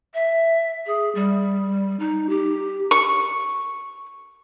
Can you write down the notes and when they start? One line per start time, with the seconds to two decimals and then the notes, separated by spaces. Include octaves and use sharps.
0.14 E5
0.86 G#4
1.15 G3
1.99 D#4
2.29 G4
2.91 C#6